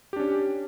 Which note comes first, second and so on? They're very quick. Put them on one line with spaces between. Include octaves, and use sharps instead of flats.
G4 D4 C#4